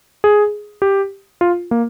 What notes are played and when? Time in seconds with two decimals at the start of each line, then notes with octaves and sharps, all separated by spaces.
0.24 G#4
0.82 G4
1.41 F4
1.71 A#3